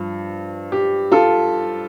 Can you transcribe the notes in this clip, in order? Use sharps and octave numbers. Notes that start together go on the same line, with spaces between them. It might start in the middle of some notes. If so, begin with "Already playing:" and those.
Already playing: G2 F3
G4
F4 A4